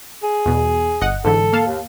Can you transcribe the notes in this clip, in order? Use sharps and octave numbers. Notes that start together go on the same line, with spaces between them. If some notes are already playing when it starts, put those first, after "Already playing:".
G#4
E2 B2
G1 D#5 F#5
G#2 D3 E3 A4
A#3 F5 A5
D#2